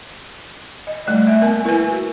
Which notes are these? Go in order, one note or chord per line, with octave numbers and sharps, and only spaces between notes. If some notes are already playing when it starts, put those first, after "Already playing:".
D#5
G3 A3 D5
A#3 E5
B3 A#4 G#5
E4 A#4 B4 G#5
F#4